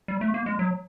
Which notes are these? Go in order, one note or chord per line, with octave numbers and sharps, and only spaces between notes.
G3
A3
A#3
G#3
F#3